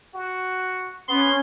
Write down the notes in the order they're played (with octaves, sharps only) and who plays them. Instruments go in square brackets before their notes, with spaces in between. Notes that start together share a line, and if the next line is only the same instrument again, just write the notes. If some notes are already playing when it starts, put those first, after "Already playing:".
[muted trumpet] F#4
[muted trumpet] B3 [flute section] C#4 [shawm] C6